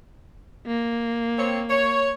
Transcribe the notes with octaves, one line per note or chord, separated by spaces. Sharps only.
A#3
C4 C#5
C#5